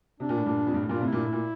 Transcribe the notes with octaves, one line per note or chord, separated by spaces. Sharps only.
C3 D4
A#2
A2
G2 A#2
F2
G2
A2
G2 A#2 F4
A2 C3
E4
G2 A#2
A2
A#2